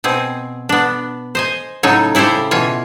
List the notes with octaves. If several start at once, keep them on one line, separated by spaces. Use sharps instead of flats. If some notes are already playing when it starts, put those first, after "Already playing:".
B2 C4 G#4
B3 D4
C5 D#5 G#5
A2 C#3 F#3 D#4 A4 C#5
C#3 E4 G4 A4 C5
B2 E3 F4 C#5